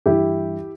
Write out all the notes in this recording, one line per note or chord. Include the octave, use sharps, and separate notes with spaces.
G2 E3 E4 G4